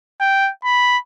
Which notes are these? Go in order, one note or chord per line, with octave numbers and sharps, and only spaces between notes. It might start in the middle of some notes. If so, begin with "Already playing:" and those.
G5
B5